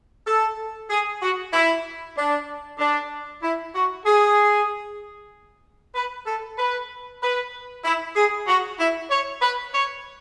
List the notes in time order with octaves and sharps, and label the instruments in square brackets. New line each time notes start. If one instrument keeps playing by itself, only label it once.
[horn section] A4
G#4
F#4
E4
D4
D4
E4
F#4
G#4
B4
A4
B4
B4
E4
G#4
F#4
E4
C#5
B4
C#5